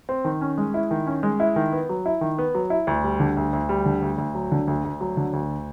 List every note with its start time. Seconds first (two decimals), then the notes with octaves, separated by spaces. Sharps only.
0.09 C4
0.25 D#3
0.41 C#4
0.58 G#3
0.74 E4
0.91 D#3
1.07 C#4
1.23 G#3
1.40 E4
1.56 D#3
1.72 B3
1.89 F#3
2.06 E4
2.21 D#3
2.38 B3
2.54 F#3
2.70 E4
2.87 D2
3.04 G3
3.20 D3
3.37 D2
3.53 D2
3.69 G3
3.86 D3
4.02 D2
4.18 D2
4.35 F#3
4.52 D3
4.67 D2
4.84 D2
5.01 F#3
5.17 D3
5.33 D2